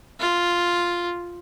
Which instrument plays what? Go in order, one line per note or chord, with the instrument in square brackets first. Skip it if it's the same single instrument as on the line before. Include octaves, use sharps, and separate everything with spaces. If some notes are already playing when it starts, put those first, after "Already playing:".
[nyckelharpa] F4